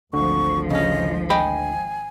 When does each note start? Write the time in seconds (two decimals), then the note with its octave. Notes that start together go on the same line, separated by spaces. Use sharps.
0.13 G#1 D2 D3 F3 C#6
0.70 C#3 C#4 D#5
1.30 D#5 G5 G#5 B5